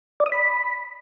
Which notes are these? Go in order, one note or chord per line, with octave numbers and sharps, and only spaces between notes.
D5
D#6
B5